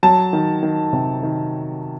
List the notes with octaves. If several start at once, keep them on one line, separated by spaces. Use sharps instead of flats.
F#3 A5
D#3
D#3
C3
D#3